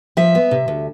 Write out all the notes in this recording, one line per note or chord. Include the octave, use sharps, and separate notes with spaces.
F3 E5
B3
C3
D2